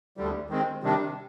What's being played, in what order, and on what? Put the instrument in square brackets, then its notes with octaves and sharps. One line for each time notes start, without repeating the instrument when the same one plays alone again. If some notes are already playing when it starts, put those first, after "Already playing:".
[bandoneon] D2 D3 G3
D#3 G#3 C4
C3 D#3 G3 D4